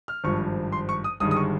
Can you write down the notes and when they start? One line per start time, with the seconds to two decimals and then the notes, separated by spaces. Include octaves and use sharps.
0.08 F6
0.24 G#1 G2 F3 C#6
0.72 C6
0.89 C#6
1.04 D#6
1.20 G1 G2 D#3 G#3 D#6
1.31 D#6
1.36 C#6